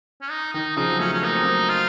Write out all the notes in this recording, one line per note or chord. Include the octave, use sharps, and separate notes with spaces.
C#4
D#4
D#3 D#4
C#3 F3 D#4
F#3
F3 A3 C#4
C#4
A#3 D#4
C4
F#3 A#3
F4